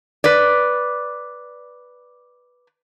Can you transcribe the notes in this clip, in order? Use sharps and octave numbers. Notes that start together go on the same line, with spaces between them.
B4 D5